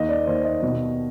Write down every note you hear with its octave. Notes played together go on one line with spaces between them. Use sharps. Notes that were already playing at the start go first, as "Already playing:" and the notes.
Already playing: D#2 D#5
D5
D#2 C5
D#5
B2